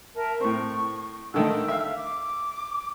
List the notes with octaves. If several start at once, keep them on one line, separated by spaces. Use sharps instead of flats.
A#4 E5 A5
A2 C4 C#6
D3 D#3 A3 E6
E5 F5
D6